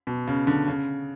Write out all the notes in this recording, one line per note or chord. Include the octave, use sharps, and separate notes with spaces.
B2
C#3
D3
C#3